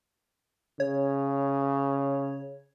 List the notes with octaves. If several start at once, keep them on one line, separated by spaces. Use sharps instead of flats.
C#3 C#5